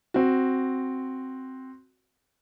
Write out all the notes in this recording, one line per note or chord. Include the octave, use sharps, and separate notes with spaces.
C4 F#4